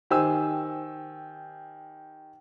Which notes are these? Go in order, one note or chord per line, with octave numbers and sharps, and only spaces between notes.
D#3 G4 C5 G#5 E6